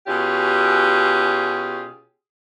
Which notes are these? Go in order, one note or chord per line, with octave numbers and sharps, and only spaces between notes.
B2 C#4 F4 G4 G#4